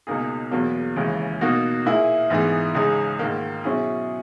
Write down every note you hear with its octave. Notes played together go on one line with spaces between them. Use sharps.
C#2 B2 A#3 D#4 G#4
E2 B2 F#3 A#3
D#2 C#3 E3 G#3
B2 A#3 D#4 F#4
A#2 A#3 E4 G#4
G#2 E3 B3 D#4 G#4
C#2 C#3 G#3 D#4 G#4
G#2 D#3 A#3
B2 F#3 C#4 E4 G#4